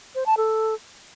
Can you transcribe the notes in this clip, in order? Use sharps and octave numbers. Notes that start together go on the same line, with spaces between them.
C5
A5
A4